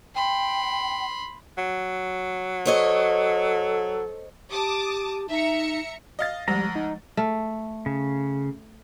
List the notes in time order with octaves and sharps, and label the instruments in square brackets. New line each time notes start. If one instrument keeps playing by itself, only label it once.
[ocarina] G5 [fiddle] B5 C6
[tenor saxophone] F#3
[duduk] A4 [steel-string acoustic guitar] C5 C#5 D#5
[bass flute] G4 [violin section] A5 D6 D#6
[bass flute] D#4 [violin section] E5 A#5 C#7
[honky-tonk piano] D#5 F5 A6
[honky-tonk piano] D2 [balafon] F3 G#3 C5 [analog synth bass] G3 [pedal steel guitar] A#5
[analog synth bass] D#4
[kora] A3
[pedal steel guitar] C#3